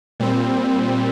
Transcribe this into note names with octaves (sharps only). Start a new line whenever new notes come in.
A#2 G3 C4